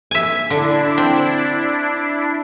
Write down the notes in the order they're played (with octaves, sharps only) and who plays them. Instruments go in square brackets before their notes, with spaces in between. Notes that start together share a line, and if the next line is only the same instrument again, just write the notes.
[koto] E5 G#5
[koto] D3 [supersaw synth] D4 E4
[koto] C4